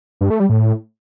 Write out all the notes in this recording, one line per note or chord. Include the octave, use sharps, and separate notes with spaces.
G2
A3
G3
A2